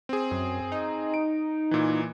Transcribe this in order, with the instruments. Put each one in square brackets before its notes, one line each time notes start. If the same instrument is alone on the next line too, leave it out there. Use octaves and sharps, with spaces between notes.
[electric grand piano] C4 G#4
[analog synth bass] F#2
D#4
[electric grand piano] D7
A#2 E3